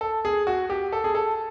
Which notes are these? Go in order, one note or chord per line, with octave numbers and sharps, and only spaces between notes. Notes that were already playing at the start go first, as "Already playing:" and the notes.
A4
G#4
F#4
G4
A4
G#4
A4